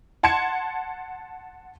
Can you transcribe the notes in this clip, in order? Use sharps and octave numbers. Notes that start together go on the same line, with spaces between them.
F#5 A5 C6 G#6 C#7 E7